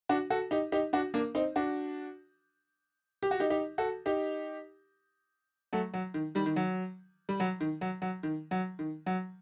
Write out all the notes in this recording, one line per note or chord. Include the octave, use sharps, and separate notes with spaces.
D4 F#4
F#4 A4
D#4 G4
D#4 G4
D4 F#4
A#3 D4
C4 D#4
D4 F#4
G4
F#4
D#4 G4
D#4 G4
F#4 A4
D#4 G4
F#3 A3
F#3
D#3
D#3 G3
D#3
F#3
G3
F#3
D#3
F#3
F#3
D#3
F#3
D#3
F#3